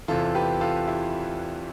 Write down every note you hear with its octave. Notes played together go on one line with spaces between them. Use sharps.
E2 C3 E3 F4 A4
G4 B4
F4 A4
E4 G4